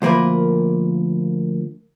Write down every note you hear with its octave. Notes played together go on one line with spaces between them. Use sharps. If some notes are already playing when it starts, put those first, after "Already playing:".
D2 F3 A#3 A#4 B4